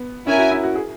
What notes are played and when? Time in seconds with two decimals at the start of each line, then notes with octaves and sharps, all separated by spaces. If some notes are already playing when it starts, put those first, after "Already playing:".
Already playing: B3
0.26 C#4 E4 A#4 E5 G#5
0.38 F#4
0.51 E4
0.63 F#4
0.76 G#4